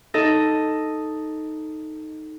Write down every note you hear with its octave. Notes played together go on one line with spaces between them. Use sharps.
D#4 A4 D#5